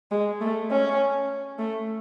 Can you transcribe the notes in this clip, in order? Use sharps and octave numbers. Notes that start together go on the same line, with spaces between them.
G#3
A3
C#4
A3